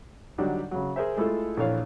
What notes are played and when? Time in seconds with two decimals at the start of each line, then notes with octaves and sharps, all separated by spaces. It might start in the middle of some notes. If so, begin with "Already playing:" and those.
0.38 D3 F#3 G3 D4 D#4
0.71 C#3 F#3
0.96 G#4 A#4 C5 E5
1.17 G#3 A3 E4 F4 A4
1.57 A#1 E3 A4 C#5 F5